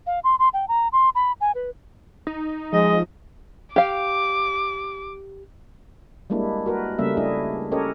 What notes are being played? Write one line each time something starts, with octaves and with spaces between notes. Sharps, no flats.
F5
C6
C6
G5
A#5
C6
B5
G#5
B4
D#4
F3 G#3 D#5
G4 F5 D6
G3 G#3 A#3 D4 E4
F#4 A#4 B4
C#3 G3 A3 A#3 C#4 E5
A3 D4 E4 G#4 D#5
C#4 G4 A4 A#4 C#5 D#5